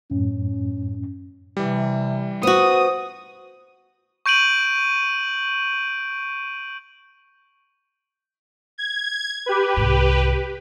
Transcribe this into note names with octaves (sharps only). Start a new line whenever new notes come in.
F#2 A2 C#4
C3 E3 G3
B3 F#4 C5 D#6
C#6 G6 D7 D#7 F#7
G#6
G4 B4
C2 G#2